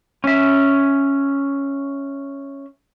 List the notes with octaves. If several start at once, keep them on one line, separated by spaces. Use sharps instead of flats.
C#4 E5